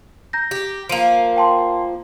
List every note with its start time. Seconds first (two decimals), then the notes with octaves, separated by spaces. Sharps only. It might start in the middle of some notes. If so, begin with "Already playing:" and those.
0.33 A#5 G6 A#6
0.51 G4
0.89 F3 A#3 D7 D#7 F7
1.37 G5 A5 C6